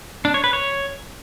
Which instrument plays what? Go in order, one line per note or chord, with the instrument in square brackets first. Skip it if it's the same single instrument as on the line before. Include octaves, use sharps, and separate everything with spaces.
[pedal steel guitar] D4
C#5
B4
C#5